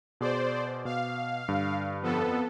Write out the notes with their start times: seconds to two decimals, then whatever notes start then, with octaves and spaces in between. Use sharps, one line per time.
0.21 B2 G#4 C5 D5 D6
0.85 B2 F5
1.48 G2 D3
2.02 F2 B3 A4